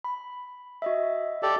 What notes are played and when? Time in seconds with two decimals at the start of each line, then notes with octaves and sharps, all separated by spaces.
0.04 B5
0.82 F#4 D#5 E5
1.43 G4 A4 D5